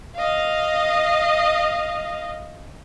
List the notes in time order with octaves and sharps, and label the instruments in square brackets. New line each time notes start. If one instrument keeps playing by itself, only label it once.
[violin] D#5 F5